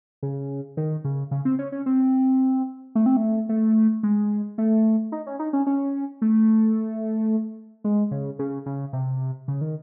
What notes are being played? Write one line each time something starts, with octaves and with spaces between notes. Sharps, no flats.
C#3
D#3
C#3
C#3
C4
C#4
C#4
C4
A3
C4
A3
A3
G#3
A3
D#4
C#4
D#4
C#4
C#4
A3
G#3
C#3
C#3
C#3
C3
C#3
D#3